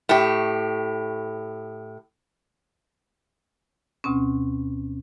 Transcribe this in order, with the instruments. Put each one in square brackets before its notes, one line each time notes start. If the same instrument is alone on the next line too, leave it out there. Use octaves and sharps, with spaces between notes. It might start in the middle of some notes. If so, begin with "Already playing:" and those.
[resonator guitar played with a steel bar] A2 G4
[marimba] D2 B2 C4 C#4